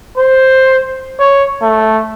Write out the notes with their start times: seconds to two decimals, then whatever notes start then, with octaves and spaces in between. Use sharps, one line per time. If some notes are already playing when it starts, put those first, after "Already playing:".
0.18 C5
1.20 C#5
1.62 A3